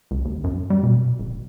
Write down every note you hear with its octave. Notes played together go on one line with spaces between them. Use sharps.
C#2
D#2
F#2
G3
B2
D#1